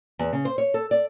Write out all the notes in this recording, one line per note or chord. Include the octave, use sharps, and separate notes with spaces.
E2
C#3
C5
C#5
A4
D5